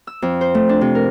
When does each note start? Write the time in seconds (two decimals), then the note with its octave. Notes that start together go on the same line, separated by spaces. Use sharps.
0.07 E6
0.22 F2
0.41 C5
0.55 A3
0.69 D4
0.81 C3
0.95 A#4